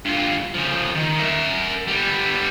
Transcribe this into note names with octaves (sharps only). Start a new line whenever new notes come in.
G2 F4
C#3 F3
D#3
A#4 E5
G3 B3